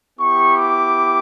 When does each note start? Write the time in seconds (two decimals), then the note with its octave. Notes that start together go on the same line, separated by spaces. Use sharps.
0.19 B3 E4 G4 C#6
0.56 D6